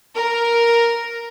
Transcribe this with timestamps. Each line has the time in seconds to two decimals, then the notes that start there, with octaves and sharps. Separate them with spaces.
0.16 A#4